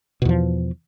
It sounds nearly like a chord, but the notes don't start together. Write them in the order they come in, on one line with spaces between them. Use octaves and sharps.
B2 E2 F3